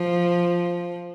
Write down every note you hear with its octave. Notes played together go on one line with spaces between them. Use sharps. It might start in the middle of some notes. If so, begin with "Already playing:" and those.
Already playing: F3